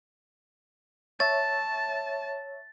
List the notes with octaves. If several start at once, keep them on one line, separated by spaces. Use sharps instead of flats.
C#5 E5 A5 A6